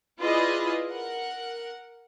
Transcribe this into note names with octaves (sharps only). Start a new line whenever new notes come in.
E4 F4 G#4 B4 D5 D#5
A#4 F#5